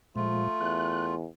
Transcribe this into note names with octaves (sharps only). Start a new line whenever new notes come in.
A#2 F3 G#3 A3 F4
E2 F#6